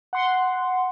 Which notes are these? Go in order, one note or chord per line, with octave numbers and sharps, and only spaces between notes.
F#5 C6